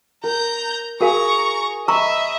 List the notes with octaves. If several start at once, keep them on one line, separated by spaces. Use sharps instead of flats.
A#4 A#5 G6
F#4 G#4 A#4 F5 A#5 C#6
D#5 E5 A#5 B5 C#6 E6